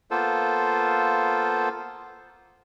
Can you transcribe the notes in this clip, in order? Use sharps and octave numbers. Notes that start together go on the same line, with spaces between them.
A#3 B3 F4 A4 C5